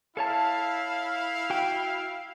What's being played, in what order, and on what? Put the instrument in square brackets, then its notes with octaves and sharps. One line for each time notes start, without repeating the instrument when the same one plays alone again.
[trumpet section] E4 F5 [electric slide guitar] A4 C#5 A5
[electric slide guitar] F#4 G5